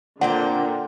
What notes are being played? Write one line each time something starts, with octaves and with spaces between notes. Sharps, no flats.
A#2 D3 A#3 C4 F#5 G5